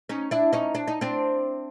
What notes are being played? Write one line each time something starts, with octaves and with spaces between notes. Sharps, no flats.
C#4 D#4
D4 E4
C#4 D#4
D4
D#4
C4 D4